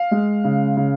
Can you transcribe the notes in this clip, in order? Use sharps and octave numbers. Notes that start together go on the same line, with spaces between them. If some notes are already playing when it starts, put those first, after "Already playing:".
Already playing: F5
G#3
C#3
C#3